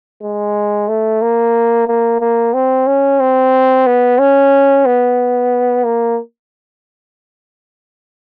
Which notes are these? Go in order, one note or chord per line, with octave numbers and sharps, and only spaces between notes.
G#3
A3
A#3
A#3
A#3
C4
C#4
C4
B3
C#4
B3
A#3